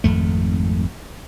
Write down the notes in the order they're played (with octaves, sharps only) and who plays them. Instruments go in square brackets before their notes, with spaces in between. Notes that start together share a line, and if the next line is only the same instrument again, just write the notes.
[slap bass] G#1 F2 A3